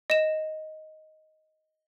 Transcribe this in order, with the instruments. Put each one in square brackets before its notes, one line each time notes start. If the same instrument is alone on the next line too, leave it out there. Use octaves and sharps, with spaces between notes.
[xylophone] D#5 E7